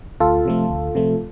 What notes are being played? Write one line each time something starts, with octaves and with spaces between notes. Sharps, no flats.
D2 F4 A4
C3 F3 A3
D2
C3 F3 A3